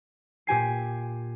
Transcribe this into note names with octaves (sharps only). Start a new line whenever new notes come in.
A#2 G4 G#5 C7